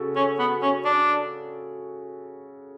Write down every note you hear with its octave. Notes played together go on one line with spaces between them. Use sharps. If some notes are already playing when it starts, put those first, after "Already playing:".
Already playing: C#3 F#4 A4
C#4
B3
C#4
D4